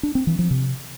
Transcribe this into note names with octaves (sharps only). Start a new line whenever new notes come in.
D4
C4
E3
F3
C3